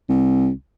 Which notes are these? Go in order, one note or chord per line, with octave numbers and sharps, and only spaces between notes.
C2